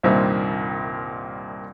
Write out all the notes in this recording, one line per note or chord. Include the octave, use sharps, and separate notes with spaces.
C2 G2 A#2 D#3 C4 E5